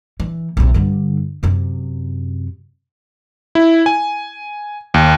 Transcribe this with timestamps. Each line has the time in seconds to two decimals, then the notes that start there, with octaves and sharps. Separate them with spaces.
0.20 E3
0.57 B1 C3
0.74 G2 D3
1.43 F#2 C3
3.55 E4
3.86 G#5
4.94 D#2